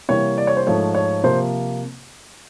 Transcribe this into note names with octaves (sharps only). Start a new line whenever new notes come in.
C3 E3 G3 A#3 C#5
D5
C#5
C5
G#2 F3 A3 C#5
C#5
C3 F3 A#3 C5